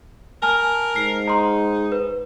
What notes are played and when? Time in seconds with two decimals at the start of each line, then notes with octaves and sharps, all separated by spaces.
0.42 A#4 G#5 A5 F6
0.96 G#2 C7
1.27 D#4 A#5 C6
1.92 B4